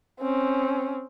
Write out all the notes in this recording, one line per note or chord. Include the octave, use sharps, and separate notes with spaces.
C4 C#4